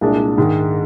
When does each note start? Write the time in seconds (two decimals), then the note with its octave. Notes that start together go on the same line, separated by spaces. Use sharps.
0.01 C2 A#2 G#3 D4
0.38 G#2 D#3 G#3